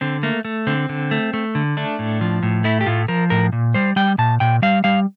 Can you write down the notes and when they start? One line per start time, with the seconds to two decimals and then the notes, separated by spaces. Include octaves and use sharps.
0.01 D3 C4
0.23 A3 A#3
0.45 A3
0.67 D3 C4
0.89 D3
1.11 A3
1.34 A3
1.55 D3
1.77 A3 D4
1.99 A2
2.21 F3
2.43 A2
2.64 A3 E4
2.81 G4
2.86 A2 F4
3.08 F3 A#4
3.30 A2 A#4
3.52 A#2
3.74 G3 C5
3.96 G3 G5
4.18 A#2 A5
4.40 A#2 G5
4.62 G3 F5
4.84 G3 F5